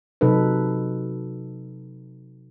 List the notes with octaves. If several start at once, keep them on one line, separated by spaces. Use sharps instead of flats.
C3 F#3 D#4 A4 B4